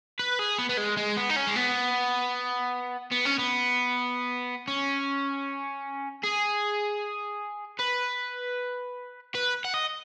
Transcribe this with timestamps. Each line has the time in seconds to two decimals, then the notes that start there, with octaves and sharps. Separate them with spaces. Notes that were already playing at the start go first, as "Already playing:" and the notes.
0.19 B4
0.39 G#4
0.58 B3
0.69 B3
0.78 G#3
0.97 G#3
1.17 B3
1.30 D#4
1.36 C#4
1.47 G#3
1.56 B3
3.12 B3
3.26 C#4
3.39 B3
4.68 C#4
6.23 G#4
7.79 B4
9.35 B4
9.64 F#5
9.74 D#5